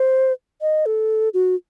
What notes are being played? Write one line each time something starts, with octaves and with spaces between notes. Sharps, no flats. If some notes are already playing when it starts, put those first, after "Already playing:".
Already playing: C5
D#5
A4
F#4